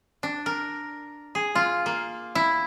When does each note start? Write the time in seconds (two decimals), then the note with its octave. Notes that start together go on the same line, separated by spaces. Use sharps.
0.23 D4
0.46 A#4
1.35 G#4
1.55 F4
1.86 A#3
2.35 E4